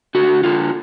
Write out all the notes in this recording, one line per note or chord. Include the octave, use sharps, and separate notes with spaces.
D3 F#4
D3 F4